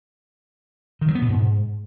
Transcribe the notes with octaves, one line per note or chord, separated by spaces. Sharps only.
D#3
F#3
B3
B2
G#2